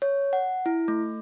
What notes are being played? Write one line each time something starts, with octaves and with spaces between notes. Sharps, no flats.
C#5
F#5
E4
A3